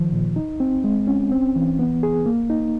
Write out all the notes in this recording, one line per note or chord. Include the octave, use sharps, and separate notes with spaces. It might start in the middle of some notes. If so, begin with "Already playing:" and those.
Already playing: D#3 F3
A#2
D#4
C4
G#3
C#4
C4
E3
B3
G#4
A#3
D#4